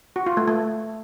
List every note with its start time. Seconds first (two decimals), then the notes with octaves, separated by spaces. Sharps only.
0.16 F#4
0.26 F4
0.37 A3
0.48 A3